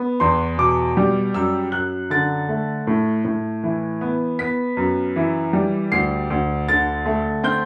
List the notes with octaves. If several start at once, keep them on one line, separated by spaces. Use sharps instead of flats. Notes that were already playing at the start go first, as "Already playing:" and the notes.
Already playing: B3
E2 C6
B2 D6
G3
F#2 E6
F#2 F#6
D3 A6
A3
A2
A2
E3
B3
B3 B6
F#2
E3
G3
D2 C7
D2
D3 A6
A3
C4 G6